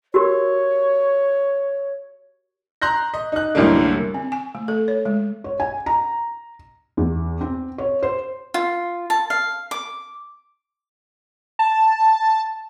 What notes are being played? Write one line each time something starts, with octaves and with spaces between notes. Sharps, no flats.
F#4 G4 A#4 C#5
A#5 C6 F#6 G6 A#6
D#5
D#4 F#6
C2 F#2 A2 D3 G3 A#3
C4
G#5
A3
A4
C#5
G#3
C#5
G#5
A#5
E2
C4
C#5
C5
F4
A5
F5
D6
A5